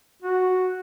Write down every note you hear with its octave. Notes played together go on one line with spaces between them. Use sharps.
F#4